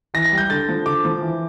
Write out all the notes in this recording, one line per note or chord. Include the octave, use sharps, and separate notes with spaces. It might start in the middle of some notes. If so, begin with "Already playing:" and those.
E3 A#6
A#6
G3
G6
D3 A6
F3
D3 D6
F3
E3